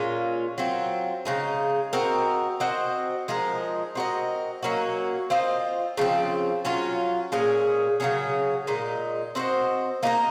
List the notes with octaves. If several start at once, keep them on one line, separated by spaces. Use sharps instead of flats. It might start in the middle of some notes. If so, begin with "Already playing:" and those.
Already playing: A#2 G#3 C#4 F4
F#3 C4 F4
C#3 G#3 D#4
C4 F#4 A#4 D#5
C4 F#4 C5 D#5
F3 G#3 D#4 A#4
C4 F#4 A#4 D#5
F#3 A#3 C#4 F#4
C4 F4 C5 D#5
C#3 F3 C4
F#3 C#4 F4
A#2 G#3 C#4 G#4
C#3 F#3 C#4 G#4
A#2 G#3 D#4
C4 F#4 C5 D#5
A#3 D#4 F#4 A#4